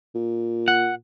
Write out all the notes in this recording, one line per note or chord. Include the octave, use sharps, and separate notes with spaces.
A#2
F#5